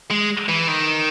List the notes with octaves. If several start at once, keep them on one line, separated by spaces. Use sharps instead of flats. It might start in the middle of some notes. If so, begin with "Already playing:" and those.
G#3
E3
D#3